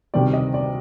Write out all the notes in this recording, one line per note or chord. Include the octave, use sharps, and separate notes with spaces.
D2 C3 D#3 G3 C4 D5
D#5
D5